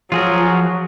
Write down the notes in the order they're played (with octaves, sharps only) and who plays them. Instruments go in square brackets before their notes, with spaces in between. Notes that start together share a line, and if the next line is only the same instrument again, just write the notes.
[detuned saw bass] F3 [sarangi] F#3 [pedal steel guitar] F4 G#4 A#4